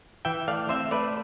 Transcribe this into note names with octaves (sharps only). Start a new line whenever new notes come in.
E3 E5 G5
A3 D5 F5
C4 C5 E5
A3 B4 D5